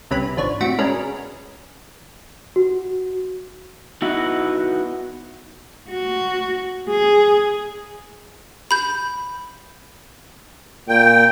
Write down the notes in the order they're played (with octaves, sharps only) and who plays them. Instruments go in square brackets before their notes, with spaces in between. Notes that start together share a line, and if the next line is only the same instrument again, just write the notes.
[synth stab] C2 C3 C#4 B4 B5
G#1 F3 D4 C#5
A2 C3 F#4 B6 D7
C#3 G#3 C#4 D4 A#4 B4
[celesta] F#4
[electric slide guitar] B3 D#4 E4 F#4 B4
[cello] F#4
G#4
[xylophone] B5 G6
[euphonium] A#2 [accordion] G5